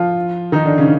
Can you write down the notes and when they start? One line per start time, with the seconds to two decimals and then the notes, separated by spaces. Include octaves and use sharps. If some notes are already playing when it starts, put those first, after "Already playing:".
Already playing: F3 F4
0.52 D#3 D#4
0.65 D3 D4
0.78 C#3 C#4